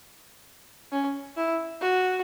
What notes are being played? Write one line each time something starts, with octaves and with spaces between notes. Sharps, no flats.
C#4
E4
F#4